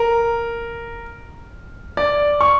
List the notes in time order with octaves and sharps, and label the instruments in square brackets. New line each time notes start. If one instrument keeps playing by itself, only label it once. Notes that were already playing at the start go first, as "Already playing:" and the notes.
Already playing: [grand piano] A#4
D5
C#6